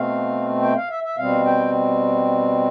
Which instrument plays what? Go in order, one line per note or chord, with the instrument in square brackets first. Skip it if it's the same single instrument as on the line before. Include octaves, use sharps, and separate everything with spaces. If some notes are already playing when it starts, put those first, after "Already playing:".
Already playing: [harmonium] B2 A3 C4 F5
G5
F5
E5
E5
B2 G3 C4 F5
G5